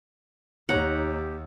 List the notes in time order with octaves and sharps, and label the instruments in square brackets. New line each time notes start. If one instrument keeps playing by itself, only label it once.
[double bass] D#2 [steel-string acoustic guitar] D#4 C#5 A#5 [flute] G4 [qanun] F#5